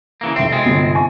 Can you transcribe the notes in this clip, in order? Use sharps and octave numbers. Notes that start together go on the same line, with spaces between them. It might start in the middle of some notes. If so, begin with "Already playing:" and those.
C#3 E3 A#3
F1 C4 E5
B2 G#3 C4 A6
G1 C3
G#5 C#6